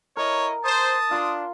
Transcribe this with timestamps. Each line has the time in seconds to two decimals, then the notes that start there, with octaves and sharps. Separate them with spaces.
0.17 E4 A#4 C#5 D#5
0.64 C5 A5 D#6
1.11 D4 F4 C6